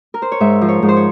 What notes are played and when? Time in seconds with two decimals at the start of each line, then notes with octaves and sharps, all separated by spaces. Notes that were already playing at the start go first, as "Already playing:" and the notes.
0.14 A#4
0.22 C5
0.32 C#5
0.40 G#2 E5
0.61 F3
0.68 C#5
0.83 G#2
0.89 C5
0.96 C#5